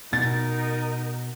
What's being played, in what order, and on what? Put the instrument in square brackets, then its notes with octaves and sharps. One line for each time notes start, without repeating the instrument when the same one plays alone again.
[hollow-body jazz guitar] B2 [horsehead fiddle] D#4 A#4 [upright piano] A6